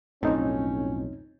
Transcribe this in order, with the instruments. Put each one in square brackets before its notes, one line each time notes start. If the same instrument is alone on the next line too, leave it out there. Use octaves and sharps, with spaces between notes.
[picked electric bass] B1 F2 A2 [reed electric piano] C4 D#4 [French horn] C#4